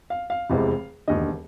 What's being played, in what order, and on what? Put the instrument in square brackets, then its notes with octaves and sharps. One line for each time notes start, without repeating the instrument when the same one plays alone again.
[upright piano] F5
F5
F1 E2 C3 E3 G#3
E1 D#2 D3 D#5